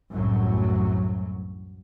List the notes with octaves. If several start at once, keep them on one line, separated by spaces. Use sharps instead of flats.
C2 F#2 A2 E3 F#3